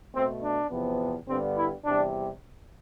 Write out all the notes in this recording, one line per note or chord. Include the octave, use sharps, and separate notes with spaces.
B2 A3 C4
D4
E2 C3 F3 B3
G2 D3 G3 B3 C4
E4
E2 C3 G3 D4